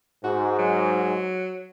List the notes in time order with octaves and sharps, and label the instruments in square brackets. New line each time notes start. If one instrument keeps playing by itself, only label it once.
[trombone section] G#2 [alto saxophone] F#4
[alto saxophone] F#3